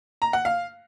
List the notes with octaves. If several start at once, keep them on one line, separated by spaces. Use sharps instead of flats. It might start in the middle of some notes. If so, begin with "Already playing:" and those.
A#5
F#5
F5